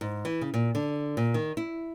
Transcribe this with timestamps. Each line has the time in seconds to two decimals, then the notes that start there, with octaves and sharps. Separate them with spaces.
0.01 G#2
0.25 E3
0.41 C#3
0.54 A#2
0.75 D3
1.17 A#2
1.34 D#3
1.57 E4